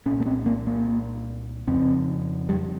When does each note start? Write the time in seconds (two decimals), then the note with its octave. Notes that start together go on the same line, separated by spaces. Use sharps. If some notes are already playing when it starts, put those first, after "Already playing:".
0.06 A#2 C#4
0.10 C2
0.20 A#3
0.26 C4
0.46 A#3
0.67 A#3
1.68 F2 C#3 C4
2.49 G3